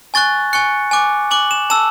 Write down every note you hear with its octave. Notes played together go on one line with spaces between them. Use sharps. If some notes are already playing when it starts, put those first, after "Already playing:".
G#5 C#6 F#6 A6
G#5 C#6 F#6 C#7
G#5 D6 F#6
G#5 D6 F#6 F#7
E7
A5 E6 E7